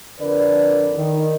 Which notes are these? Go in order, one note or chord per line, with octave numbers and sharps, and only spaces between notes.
F2 D3 A#4 B4 D5
D#3